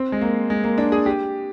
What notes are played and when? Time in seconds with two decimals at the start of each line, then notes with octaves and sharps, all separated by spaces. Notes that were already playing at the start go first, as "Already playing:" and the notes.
Already playing: C4
0.12 G#3
0.21 A#3
0.50 G#3
0.64 A#3
0.78 D4
0.92 G#4
1.06 G4